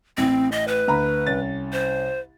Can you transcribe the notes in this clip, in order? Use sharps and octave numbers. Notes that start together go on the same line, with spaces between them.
A1 A2 C4
D#5
B4
D2 A#5 B5
C2 C#4 A6
C5